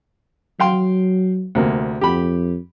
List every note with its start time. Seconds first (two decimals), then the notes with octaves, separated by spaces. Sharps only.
0.60 F#3 F5 G5 C6
1.55 D2 C3 A#3
2.01 F2 G4 B5